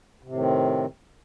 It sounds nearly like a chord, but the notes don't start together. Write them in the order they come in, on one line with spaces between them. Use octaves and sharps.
C3 A2 D#3 C4